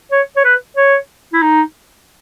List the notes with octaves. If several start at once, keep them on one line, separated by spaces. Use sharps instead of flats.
C#5
C#5
B4
C#5
E4
D#4